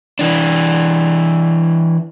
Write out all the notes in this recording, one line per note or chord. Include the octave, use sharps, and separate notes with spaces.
E3 D4